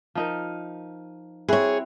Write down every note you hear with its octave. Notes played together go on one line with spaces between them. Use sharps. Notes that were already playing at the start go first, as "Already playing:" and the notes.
F3 D#4 A#4
C4 E4 F#4 G#4 C#5